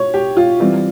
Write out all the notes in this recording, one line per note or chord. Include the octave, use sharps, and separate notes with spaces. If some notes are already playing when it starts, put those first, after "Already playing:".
Already playing: C#5
G4
F4
E3 G3 C4